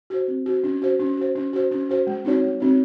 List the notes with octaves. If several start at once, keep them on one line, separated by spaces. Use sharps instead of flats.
F#4 C5
C4
F#4 C5
C#4
F#4 C5
C#4
F#4 C5
C#4
F#4 C5
C#4
F#4 C5
G#3
C4 D#4 F#4 C#5
G#3
C4 D#4 F#4 C#5